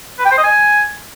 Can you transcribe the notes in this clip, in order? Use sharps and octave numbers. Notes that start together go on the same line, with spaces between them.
B4
G5
C5
D#5
G#5